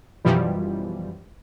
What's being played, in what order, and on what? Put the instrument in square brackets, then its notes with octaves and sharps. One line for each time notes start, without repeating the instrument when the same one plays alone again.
[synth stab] F#2 B2 E3 F3 G3